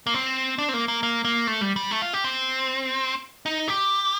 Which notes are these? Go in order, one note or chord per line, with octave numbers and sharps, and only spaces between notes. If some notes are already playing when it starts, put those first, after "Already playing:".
A#3
C4
D4
C4
A#3
A#3
A#3
A#3
A3
G3
G3
A3
F4
G4
C4
D#4
G4